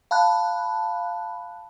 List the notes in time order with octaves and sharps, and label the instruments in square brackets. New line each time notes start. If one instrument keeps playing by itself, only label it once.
[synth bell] F5 A5 B5 F#6